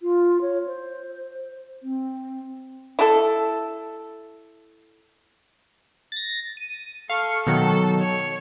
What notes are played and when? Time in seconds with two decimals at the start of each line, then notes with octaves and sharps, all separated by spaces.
0.02 F4
0.41 C#5
0.67 C5
1.83 C4
2.99 E4 A4
6.12 A6 A#6
6.57 D#7
7.10 A4 F5 C#6
7.47 B2 D#3 F#3 A4
8.01 C#5